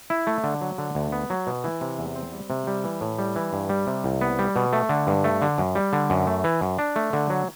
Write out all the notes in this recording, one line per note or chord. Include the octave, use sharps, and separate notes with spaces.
E4
A3
D3
F#3
D3
D2
B3
F#3
B2
E3
C3
E2
C4
G3
C3
G3
E3
A2
G3
E3
G2
G3
C3
C2
B3
G3
B2
A3
D3
G2
A3
D3
F#2
G3
D3
F#2
A3
E3
F#2
D4
A3
D3
F#3